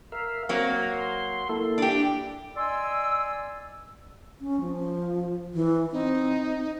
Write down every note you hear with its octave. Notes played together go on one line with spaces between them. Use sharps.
A#4 E5 F5
F#3 A#3 C4
A#5
C6
A#3 E4 A4
D4 G4
D5 D#5 G#5 C6 E6
C#4
F3
E3
C4 D#4